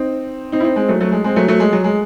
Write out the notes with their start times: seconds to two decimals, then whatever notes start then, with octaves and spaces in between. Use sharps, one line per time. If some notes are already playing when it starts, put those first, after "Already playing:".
Already playing: C4 D#4
0.52 C4 D#4
0.60 E4
0.65 C4 D#4
0.76 G#3 C4
0.89 F#3 A3
1.01 F#3 A3
1.12 G#3
1.24 G#3 C4
1.36 F#3 A3
1.48 F#3 A3
1.60 G#3
1.73 F#3
1.84 G#3